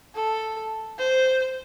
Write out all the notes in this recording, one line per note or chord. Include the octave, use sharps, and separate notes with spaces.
A4
C5